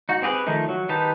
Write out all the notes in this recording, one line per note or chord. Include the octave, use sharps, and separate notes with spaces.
D#4 F#4
C4 G4 G#4 B4
D#3 F3 A3 D#4
F#3
D#3 D#4 G4 B4 A5